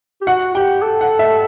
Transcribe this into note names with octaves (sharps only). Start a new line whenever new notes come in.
G4
F#4 F#5
G4 G5
A4
F#5
E5